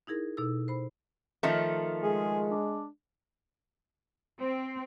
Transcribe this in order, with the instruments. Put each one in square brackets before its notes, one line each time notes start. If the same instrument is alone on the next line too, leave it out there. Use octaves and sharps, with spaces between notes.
[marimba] D#4 E4 G#4 A#4
B2 D#4 A4 E6
C5 B5
[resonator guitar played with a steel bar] D#3 F3 A3
[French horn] G#3 [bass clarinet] G#4
[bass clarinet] D4
[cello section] C4